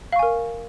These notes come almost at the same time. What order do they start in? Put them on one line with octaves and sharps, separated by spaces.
F5 C#6 G#5 A#4